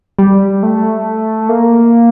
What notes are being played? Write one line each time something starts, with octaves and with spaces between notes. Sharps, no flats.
G3
A3
A#3